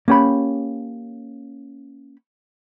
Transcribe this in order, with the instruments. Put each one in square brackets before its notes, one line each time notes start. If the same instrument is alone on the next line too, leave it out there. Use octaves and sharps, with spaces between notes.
[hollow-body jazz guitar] A#3 C#4 G4 B5